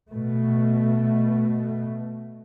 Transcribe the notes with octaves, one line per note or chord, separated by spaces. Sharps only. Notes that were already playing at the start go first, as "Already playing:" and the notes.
B2 A3